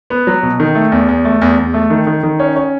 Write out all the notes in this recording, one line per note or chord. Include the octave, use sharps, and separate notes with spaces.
B3
F#3
B2
D#3
A3
E2
E2
A3
E2
E2
A3
D#3
D#3
D#3
C#4
C#4